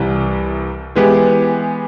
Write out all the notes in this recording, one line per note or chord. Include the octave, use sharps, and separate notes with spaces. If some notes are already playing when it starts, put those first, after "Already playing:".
Already playing: C2 C3 E3 G3
E3 G#3 B3 E4 G4